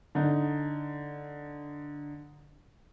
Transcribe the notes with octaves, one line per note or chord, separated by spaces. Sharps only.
D3 D#4